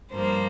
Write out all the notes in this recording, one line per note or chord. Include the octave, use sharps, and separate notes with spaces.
G2 F3 A#3 C5